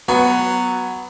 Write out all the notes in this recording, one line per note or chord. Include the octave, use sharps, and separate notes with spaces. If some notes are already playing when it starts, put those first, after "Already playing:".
F#3 B3